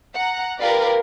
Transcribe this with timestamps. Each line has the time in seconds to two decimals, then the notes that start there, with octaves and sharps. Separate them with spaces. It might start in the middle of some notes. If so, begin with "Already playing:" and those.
0.15 F#5 A#5
0.60 F4 G4 A#4 B4 D5 F5